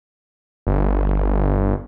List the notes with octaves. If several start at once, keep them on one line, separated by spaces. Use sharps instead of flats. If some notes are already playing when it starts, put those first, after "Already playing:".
G1